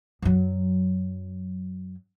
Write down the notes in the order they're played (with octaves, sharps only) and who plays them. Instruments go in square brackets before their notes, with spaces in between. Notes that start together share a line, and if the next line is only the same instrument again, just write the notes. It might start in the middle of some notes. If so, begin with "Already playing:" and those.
[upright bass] F#2 F#3